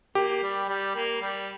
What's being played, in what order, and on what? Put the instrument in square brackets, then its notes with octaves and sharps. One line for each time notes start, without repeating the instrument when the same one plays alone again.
[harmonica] A#3 [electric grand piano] G4
[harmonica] G3
G3
A#3
G3